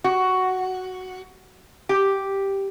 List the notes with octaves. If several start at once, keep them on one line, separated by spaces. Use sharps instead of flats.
F#4
G4